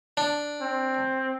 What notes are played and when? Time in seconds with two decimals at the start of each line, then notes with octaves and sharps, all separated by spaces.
0.17 D4
0.61 C4